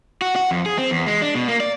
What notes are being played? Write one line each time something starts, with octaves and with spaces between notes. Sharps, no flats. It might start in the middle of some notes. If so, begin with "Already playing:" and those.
F#4
F#4
F2
G#4
C4
E2
G#3
D4
B2
A#3
D5